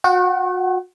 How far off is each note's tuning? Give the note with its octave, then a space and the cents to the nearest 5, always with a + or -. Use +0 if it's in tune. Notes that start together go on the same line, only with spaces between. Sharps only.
F#4 -35 F#5 +35